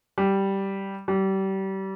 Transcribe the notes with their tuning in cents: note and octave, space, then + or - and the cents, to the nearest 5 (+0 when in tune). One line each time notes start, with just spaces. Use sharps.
G3 -5
G3 -30